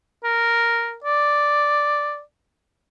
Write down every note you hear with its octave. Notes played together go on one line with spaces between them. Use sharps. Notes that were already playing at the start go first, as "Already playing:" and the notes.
A#4
D5